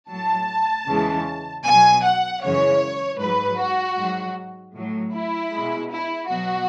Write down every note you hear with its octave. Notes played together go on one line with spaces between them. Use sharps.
A2 F#3 A5
E2 C#3 E3 G#3
B2 F#3 G#5
F#5
F#2 C#3 E3 G#3 C#5
G#2 F#3 B4
F#4
G#2 F#3
A2 F#3
E4
B2 G#3
E4
B2 F#3 F#4